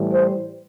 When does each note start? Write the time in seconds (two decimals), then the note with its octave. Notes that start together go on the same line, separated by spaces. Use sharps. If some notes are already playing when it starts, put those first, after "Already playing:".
Already playing: A2 E3 G3
0.13 C5